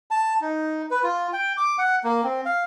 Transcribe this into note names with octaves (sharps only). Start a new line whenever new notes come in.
A5
D#4
B4
F4
G5
D6
F#5
A#3
C4
F5